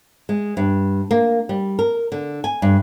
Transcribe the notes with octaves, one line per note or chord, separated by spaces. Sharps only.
G#3
G2
A#3
G3
A#4
D3
G#5
G2